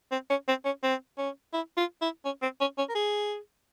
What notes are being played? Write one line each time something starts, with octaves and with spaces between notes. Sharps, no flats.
C4
C#4
C4
C#4
C4
C#4
E4
F4
E4
C#4
C4
C#4
C#4
A#4
G#4